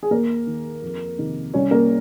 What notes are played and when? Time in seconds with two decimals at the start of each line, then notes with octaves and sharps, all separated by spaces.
0.03 G#4
0.11 D#2 A#3 A#4
0.47 D#3
0.82 F2
1.18 C3 D#3
1.54 C2 C#4 C#5
1.71 A#3 A#4